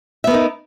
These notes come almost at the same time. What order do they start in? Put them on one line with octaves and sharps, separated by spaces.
E5 B3 A#4 D#4